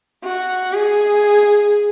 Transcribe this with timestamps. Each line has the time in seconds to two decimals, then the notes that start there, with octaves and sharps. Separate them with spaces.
0.24 F#4
0.73 G#4